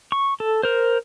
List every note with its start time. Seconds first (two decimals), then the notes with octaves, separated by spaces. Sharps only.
0.12 C#6
0.40 A4
0.63 A#4 C5